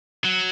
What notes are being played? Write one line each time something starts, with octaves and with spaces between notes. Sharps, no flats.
F#3